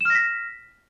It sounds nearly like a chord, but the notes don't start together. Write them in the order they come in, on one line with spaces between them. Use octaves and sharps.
E7 F6 A#6 B6